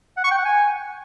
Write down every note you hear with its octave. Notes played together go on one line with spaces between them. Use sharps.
F#5
C#6
G5
F#5
G#5